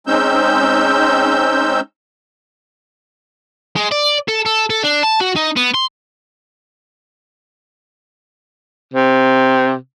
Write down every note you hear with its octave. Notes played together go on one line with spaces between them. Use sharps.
G#3 C4 C#4 D#4 E6 G6
G#3
D5
A4
A4
A4
D4
A5
F#4
D#4
B3
C6
C3